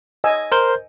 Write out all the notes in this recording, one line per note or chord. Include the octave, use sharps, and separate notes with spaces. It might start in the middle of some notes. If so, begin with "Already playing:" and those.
D#5 G#5 E6
A#4 C5 G6